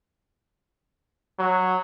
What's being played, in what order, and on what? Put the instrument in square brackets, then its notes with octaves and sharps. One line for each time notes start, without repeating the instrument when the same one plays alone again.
[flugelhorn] F#3